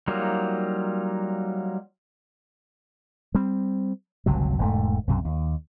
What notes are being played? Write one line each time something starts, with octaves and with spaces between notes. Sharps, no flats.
F#3 G3 A#3 D#4 F4
G3 C4
G1 C#2 C3 F#3
E1 G#2 A3
B1 F#2 C3
D#2